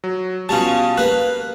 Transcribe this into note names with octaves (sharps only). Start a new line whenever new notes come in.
F#3
B2 G3 C#4 F4 A5
A#3 B4 F#6